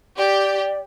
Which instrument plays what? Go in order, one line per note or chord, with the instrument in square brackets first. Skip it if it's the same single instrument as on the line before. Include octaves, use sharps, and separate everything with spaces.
[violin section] G4 [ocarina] D5